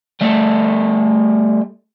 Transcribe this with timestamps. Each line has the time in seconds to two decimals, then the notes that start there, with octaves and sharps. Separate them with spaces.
0.21 G3 A3